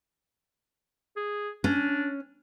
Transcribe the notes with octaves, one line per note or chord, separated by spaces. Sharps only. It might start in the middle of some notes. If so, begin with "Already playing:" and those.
G#4
C#4 D4